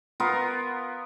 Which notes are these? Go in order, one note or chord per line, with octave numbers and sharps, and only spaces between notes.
B3 F4 A#4